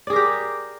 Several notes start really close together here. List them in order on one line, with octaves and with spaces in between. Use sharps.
D5 G#4 A#4 G4